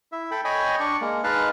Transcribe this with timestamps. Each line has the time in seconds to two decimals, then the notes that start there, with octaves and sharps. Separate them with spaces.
0.12 E4 E5
0.31 A4 G5 B5
0.45 C#5 D#5 G5 G#5 B5
0.80 D4 D5 C#6
1.01 G#3 A#3
1.24 G#3 D#4 B4 F5 A5 F#6